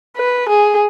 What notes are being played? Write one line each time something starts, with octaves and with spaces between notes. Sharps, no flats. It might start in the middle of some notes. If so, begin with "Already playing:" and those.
B4
G#4